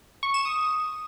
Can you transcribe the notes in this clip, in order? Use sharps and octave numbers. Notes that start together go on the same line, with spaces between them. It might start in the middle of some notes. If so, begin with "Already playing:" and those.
C#6
E7
D#6